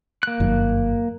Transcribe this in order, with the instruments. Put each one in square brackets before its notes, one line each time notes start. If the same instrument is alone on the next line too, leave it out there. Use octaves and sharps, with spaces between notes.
[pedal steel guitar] A#3 F#6
[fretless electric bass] G1 F#2 D#3